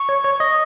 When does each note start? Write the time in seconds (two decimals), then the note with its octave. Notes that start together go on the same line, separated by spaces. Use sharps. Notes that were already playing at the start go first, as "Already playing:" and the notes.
Already playing: C#6
0.09 C#5
0.24 C#5
0.40 D#5